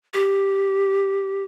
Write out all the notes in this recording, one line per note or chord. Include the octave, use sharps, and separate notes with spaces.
G4